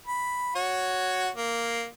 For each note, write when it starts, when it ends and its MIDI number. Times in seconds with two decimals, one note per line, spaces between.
0.06 0.52 83
0.55 1.29 66
0.55 1.29 73
1.36 1.86 58